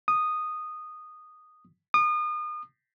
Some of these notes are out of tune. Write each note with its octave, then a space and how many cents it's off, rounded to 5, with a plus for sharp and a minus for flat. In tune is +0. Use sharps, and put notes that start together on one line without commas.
D#6 -10
D#6 -35